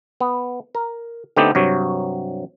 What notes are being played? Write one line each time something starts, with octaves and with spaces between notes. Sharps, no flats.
B3
A#4
D3 A3 B3 C4 D#4 G4
G2 C3 F#3 C#5